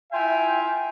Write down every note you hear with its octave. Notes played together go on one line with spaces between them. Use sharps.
E4 F4 E5 G5 G#5